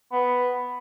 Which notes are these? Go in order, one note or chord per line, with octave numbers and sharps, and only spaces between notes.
B3